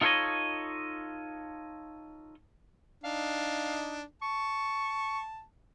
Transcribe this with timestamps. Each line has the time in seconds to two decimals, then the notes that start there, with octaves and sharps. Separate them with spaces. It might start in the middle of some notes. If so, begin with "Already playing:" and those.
0.01 D#4 F4 A4 C5 C#5 D#5
3.04 D4 D#4 F5
4.22 A5 C#6